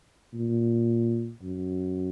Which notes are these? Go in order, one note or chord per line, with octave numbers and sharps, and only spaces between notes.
A#2
F#2